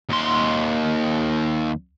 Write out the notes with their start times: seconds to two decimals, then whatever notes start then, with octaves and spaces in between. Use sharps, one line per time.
0.10 D#2 C6